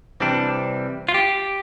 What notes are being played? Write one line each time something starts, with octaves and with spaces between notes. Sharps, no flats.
C3 E3 G3 C4 D4
F4
G4